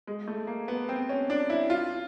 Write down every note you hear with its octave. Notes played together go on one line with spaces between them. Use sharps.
G#3
A3
A#3
B3
C4
C#4
D4
E4
F4